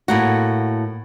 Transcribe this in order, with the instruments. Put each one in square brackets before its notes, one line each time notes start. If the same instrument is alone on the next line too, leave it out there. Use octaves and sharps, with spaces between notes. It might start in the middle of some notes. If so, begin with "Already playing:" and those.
[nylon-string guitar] A2 A#3 F#4